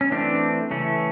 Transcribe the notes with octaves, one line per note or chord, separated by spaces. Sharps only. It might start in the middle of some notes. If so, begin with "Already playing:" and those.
C#4
E3 A3 C4 D4
C#3 E3 A3 C#4